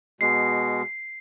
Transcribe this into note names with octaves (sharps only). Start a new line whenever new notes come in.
B2 G#3 C7